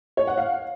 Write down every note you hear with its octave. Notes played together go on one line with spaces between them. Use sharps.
C#5
F#5
F5